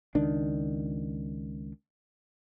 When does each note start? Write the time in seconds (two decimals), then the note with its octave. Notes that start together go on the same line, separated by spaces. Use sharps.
0.15 C#2 D#3 D4